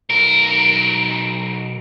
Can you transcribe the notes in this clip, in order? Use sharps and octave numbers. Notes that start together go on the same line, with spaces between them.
B1 A#4